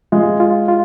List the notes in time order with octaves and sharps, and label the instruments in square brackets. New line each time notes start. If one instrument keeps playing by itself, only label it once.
[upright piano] G#3 [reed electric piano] F4
[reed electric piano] F4
F4